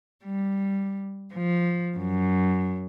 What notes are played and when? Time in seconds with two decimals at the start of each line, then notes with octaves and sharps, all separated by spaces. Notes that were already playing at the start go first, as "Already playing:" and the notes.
0.24 G3
1.35 F3
1.97 F#2